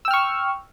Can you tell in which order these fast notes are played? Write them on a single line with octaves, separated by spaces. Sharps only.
E6 G5 F6 C#6